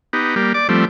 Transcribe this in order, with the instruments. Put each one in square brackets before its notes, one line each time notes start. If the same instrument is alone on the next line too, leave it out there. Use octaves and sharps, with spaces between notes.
[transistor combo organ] B3 D#4 G4
G3 A#3 G4
D5 D6
F3 G3 A3 C4